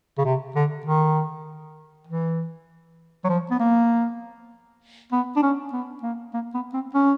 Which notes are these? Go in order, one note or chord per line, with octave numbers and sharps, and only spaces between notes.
C#3
C3
D3
D#3
E3
F#3
F3
B3
A#3
B3
D4
C#4
B3
A#3
A#3
B3
C4
C#4